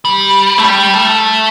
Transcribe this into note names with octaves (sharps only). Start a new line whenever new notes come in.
G3
A3
G3
A3